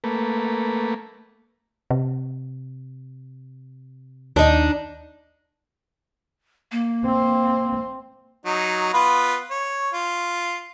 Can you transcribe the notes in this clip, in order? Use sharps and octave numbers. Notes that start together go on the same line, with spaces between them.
A3 A#3 B4
C3
D#2 D4 D#4
A#3
C4
F#3 D#4
B3 F4 B4
C#5
F4